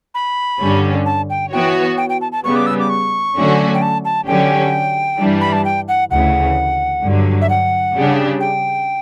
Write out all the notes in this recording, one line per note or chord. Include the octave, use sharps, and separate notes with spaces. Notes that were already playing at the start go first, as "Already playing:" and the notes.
B5
G2 D3 G3 C#4
A5
G5
E3 B3 F#4 C#5 G5
G5
G5
A5
A5
C#3 G3 B3 C#6
D6
E6
D6
C#6
D3 F#3 A3 C#4 F#4
G5
A5
A5
D3 F#3 C#4 G4 G5
G2 E3 G3 D4
B5
A5
G5
F#5
D2 C#3 E3 F#5
G2 D3 F#3
E5
F#5
C#3 G3 D4 G4
G5